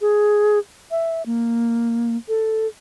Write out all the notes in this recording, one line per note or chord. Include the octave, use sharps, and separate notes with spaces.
G#4
E5
A#3
A4